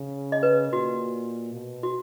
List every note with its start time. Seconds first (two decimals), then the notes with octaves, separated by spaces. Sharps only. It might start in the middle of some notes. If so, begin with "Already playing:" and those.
Already playing: C#3
0.32 D#5
0.43 B4
0.72 A#2 F#4
1.54 B2
1.83 F#4